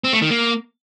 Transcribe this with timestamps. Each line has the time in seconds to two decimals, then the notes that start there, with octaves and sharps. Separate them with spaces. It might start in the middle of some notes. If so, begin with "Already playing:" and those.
0.04 C4
0.13 A3
0.22 D#3
0.31 A#3